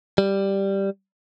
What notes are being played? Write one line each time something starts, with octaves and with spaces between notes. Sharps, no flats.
G3